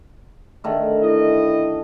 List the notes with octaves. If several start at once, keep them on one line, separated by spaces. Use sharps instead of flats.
D3 D#3 A3
E4 D#5